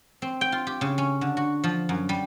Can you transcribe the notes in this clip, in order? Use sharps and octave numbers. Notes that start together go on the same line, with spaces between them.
C4
G5
F4
G4
C#3
C#4
D3
F#4
F3
F#2
G3